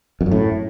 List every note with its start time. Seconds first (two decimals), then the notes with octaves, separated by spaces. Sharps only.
0.21 F2
0.26 F#2
0.32 A2